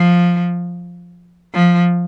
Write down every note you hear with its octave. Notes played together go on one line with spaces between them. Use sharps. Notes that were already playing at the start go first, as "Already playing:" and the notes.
Already playing: F3
F3